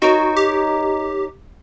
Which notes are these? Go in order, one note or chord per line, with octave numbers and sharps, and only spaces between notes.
D#4 F#4 A#4 C#5
G4